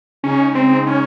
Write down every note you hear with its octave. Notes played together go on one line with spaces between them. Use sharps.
C#3 G#3 C#4 D#4
C4
C#4